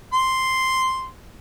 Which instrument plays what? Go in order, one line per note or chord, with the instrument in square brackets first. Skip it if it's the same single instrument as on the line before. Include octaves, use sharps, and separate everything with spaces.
[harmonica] C6